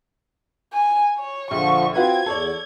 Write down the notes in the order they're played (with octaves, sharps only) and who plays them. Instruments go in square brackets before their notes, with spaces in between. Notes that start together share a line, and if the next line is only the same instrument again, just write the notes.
[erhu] G#5
C#5
[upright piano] A#1 [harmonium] D3 F3 [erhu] C#6
[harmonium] C4 [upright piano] F4 F#4 B4 [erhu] G#6
[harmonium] E2 [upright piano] A4 C#5 D5